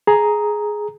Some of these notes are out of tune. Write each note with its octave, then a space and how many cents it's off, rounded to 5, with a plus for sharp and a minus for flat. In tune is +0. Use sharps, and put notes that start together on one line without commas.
G#4 +10 A#5 +0